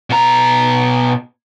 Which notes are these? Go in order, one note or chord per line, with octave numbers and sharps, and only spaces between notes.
B2 A#5